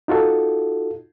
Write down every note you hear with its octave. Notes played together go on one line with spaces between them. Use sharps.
D#4 F4 F#4 A4